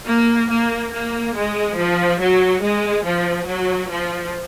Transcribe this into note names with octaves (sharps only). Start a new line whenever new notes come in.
A#3
A#3
A#3
G#3
F3
F#3
G#3
F3
F#3
F3